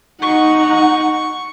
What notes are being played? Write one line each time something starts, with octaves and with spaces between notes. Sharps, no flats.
D#4 F#5 C#6